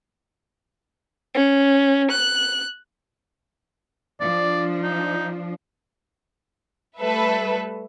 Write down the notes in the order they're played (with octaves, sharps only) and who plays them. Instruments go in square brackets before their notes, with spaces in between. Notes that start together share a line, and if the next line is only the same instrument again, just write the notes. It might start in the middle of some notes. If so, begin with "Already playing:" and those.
[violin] C#4
F#6
[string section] F3 D4 [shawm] D5
[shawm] D#4
[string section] G3 A3 A4 B4 E5